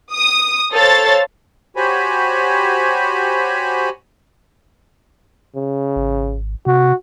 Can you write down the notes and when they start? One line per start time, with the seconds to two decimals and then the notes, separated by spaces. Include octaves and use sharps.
0.14 D#6
0.73 A4 C5 C#5 F5 A6
1.76 F#4 G4 C5 C#5 G#5 B5
5.56 C#3
5.96 G#1
6.66 C3 F#4